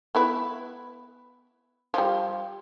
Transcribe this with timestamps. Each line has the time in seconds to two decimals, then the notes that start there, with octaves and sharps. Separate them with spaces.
0.15 B3 E4 B4
1.94 F3 G3